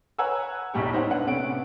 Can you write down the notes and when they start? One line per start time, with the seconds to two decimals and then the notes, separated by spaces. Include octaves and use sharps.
0.19 B4 C#5 F#5 G#5 A#5 E6
0.74 E1 B1 E2 G3 G4 C#6
0.93 D#4 C5 C#5 F#5
1.10 D4 B4 F#5
1.27 C3 A3 B3 C#4 F#5 D7